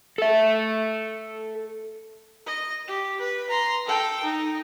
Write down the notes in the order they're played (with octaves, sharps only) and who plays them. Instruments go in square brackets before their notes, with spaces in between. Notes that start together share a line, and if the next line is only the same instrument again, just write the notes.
[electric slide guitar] A4 E5
[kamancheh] D#5
G4
B4
A#5 C6
A4 G5
D#4